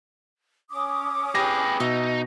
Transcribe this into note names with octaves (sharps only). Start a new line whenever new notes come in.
C#4 D6 D#6
G4 G#4 B4 A#6
B2 D#4 E5